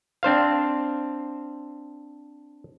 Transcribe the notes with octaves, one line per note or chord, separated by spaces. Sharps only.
C4 D4 C5 F5